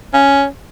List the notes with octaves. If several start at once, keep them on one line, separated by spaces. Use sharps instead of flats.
C#4